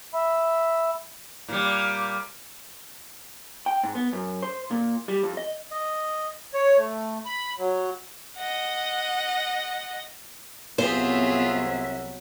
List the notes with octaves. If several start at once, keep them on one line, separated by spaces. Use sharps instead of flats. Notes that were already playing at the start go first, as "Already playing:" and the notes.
E5 B5
A#2 G3
G5
G#2
B3
F#2
C5
A#2
G3
F2
D#5
D#5
C#5
A3
B5
F#3
D#5 F#5
C2 F#3 B3 C4 F4 G#4 C5 E5